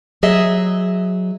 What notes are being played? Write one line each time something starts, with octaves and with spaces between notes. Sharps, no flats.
F#3 G#4 D#5 E5